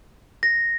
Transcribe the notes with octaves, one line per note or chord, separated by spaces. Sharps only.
A#6